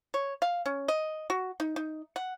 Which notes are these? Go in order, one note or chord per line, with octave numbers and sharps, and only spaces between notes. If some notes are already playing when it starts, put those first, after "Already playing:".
C#5
F5
C#4
D#5
F#4
D#4
D#4
F#5